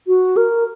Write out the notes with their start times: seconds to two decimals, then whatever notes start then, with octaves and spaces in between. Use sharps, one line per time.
0.07 F#4
0.37 A#4